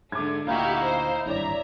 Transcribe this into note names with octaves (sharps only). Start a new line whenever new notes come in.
G#2 D3 A3 D6 G#6
D2 A#2 D#4 E4 F#4 G4 F5 G5
C5
D1 G#1 G2 E3 C#5 D5 E5 A#5